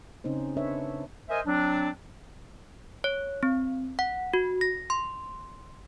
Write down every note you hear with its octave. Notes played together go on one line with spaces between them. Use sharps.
C#3 C4 C#4 D#4 C5
D4 B4 C#5 E5
A#4 C5 D#5 E5 G#5
F#3 C4 D4
C#5
C4
F#5
F#4
A#6
C6